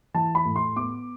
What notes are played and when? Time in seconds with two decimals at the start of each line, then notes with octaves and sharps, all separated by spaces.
0.14 E3 A5
0.35 B5
0.45 A2
0.56 C6
0.76 B3 D6